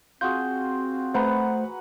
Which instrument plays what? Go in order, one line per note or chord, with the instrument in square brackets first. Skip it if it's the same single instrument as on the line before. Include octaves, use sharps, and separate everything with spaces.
[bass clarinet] C4 [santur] F4 F#4 G#4 [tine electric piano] G6
[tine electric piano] A3 C5 [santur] B4 F#5 A#5